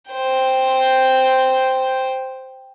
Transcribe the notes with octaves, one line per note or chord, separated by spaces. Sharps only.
C5 G5